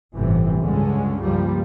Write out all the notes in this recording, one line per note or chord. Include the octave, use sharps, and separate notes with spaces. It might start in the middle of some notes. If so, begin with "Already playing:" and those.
G1 A2 C3 E3
C#2 G2 D3 G#3 C#4
C#2 G2 F3 G3 A#3